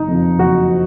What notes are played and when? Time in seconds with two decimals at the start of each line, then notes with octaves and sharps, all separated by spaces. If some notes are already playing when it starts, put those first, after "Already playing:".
Already playing: F#1 D#4
0.08 F2 F3
0.39 F#1 F#4
0.69 F3